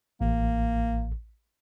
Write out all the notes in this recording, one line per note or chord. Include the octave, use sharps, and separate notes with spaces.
A1 A#3